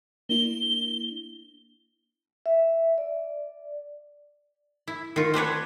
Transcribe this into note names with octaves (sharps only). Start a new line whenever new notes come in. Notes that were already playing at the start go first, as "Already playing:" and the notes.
A#3 D4 E4 G7
E5
D5
E4
D#3 F4
C4 D4 B4 C#5